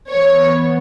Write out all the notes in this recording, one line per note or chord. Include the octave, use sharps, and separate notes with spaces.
E3 B3 C#5